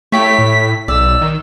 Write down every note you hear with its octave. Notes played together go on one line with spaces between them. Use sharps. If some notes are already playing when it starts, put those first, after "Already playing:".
A3 E4 G4 C#5 B6
A2
B1 D5 E6
D#3